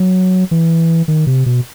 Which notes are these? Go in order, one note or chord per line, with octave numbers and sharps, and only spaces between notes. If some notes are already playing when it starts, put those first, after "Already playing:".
Already playing: F#3
E3
D#3
C3
B2